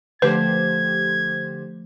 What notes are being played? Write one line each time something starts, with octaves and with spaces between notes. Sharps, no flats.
D3 F3 A3 G4 B4 C5 G#6